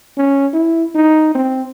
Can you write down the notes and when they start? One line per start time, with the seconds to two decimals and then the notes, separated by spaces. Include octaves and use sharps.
0.17 C#4
0.53 E4
0.95 D#4
1.35 C4